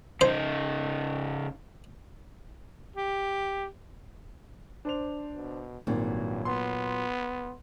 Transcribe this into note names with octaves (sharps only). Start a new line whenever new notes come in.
C#3 D#4 C5
G4
D4 C5 F7
B2
G#1 G2 A#2 F#3
B3 C6